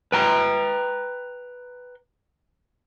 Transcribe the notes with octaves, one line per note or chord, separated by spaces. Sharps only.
B4 G5 A#5